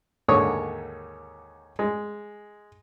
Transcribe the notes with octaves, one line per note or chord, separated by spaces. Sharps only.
D#2 G#2 D3 C#5 C#6 D#6
G#3